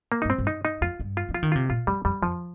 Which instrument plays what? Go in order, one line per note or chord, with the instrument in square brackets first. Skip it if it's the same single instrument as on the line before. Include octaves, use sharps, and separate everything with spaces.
[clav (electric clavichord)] A#3
D#4
[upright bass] G2
[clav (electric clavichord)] C4
[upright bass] G2
[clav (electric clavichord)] D#4
D#4
[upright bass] F2 [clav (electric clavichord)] F4
[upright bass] G2
[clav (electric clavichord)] F4
[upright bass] F3
[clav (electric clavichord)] F4
[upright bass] D#3
[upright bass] C3 [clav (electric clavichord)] F4
[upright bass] A#2 [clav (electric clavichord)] F4
[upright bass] F2 [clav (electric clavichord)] G3
[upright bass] F2 [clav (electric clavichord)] G3
[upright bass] F2 [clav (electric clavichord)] F3